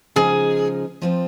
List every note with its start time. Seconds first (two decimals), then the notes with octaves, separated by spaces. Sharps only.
0.16 C#3 F3 G#3 D#4 G#4
1.02 F3 C4 F4 C5